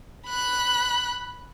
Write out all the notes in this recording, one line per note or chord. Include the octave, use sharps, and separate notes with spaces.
B5 F#6